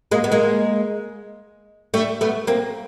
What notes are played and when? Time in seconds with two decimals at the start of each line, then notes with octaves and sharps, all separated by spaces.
0.11 G#3 A#3
0.24 B3
0.32 G#3 A#3
1.94 G3 A3
2.21 A3 B3
2.47 A#3 C4